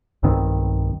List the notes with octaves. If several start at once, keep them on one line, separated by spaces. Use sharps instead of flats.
B1 G2 D#3 C4